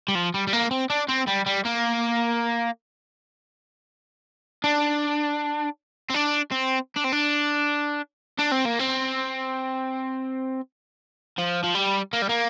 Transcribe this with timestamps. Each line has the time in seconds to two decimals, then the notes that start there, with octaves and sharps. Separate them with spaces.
0.08 G3
0.15 F3
0.34 G3
0.47 G3
0.53 A#3
0.71 C4
0.90 D4
1.09 C4
1.28 G3
1.46 G3
1.65 A#3
4.64 D4
6.10 C4
6.14 D4
6.51 C4
6.96 D4
7.04 C4
7.13 D4
8.39 D4
8.52 C4
8.66 A#3
8.79 C4
11.38 F3
11.64 F3
11.75 G3
12.13 A#3
12.22 G3
12.29 A#3